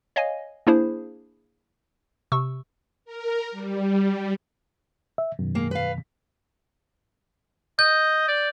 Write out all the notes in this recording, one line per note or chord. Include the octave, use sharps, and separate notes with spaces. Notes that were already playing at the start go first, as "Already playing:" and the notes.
C#5 D#5 F5 G#5
A#3 D4 E4 G#4 C5
C3 C#6 E6
A#4
G3
E5
F#2 B2 D#3
G#3 A#3
B4 F5
D#5 G6
D5